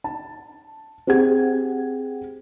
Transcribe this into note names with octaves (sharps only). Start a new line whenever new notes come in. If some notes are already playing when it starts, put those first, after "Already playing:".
A5
C4 G4 G#4 F#5 G#6